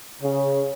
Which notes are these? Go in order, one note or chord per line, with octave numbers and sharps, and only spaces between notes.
C#3